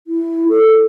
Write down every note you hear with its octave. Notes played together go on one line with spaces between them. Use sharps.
E4
A4